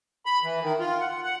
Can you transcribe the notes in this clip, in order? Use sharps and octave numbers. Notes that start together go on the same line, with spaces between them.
B5
E3
D#3
F4
F#5
F#5